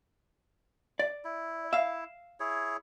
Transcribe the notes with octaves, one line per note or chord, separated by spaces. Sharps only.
D5
E4
E5 F5
E4 G#4 C#5